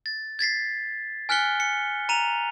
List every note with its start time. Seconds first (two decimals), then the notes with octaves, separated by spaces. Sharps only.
0.06 A6
0.39 G#6 A6 B6 C7
1.29 G#5 F6 F#6 B6 C#7 G7
1.60 C#7
2.09 A#5 D#7 F7